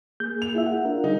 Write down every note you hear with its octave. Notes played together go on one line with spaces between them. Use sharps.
A#3 G#4 G6
F7
E4 F4 E5
F#5
D4 F4 A#4
D3 G3 D#4 G#4